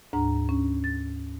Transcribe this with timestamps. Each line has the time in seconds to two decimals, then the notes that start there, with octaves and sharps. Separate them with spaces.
0.13 D2 G#2 D4 A#5
0.49 C#4
0.84 A6